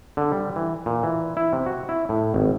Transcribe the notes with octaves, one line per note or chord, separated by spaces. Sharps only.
D3
G3
E3
A#2
E3
E4
C3
F#4
E4
A2
G#1